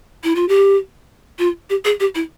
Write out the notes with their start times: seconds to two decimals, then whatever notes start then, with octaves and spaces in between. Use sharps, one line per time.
0.24 E4
0.35 F4
0.49 G4
1.39 F4
1.70 G4
1.85 G#4
2.00 G4
2.15 E4